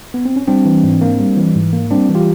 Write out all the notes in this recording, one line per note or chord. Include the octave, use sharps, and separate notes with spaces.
B3
C4
C#4
G3 C4 D4
E3
G#2
A#3
G3
E3
G#2
A#3
G3 C4 D4
E3
F4 G4